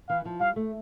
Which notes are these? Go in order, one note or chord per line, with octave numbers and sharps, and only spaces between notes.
E3 F5
F3
G3 F5
A3